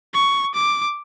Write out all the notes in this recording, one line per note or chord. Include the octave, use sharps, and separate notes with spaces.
C#6
D6